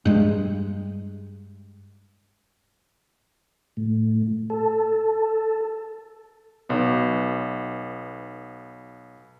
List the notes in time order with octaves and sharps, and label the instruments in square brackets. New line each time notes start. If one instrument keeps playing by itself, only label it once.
[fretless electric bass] G2 G#3
[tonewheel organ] A2
A4
[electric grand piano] B1 B3